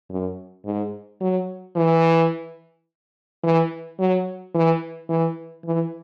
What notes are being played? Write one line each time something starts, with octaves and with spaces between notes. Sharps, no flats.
F#2
G#2
F#3
E3
E3
F#3
E3
E3
E3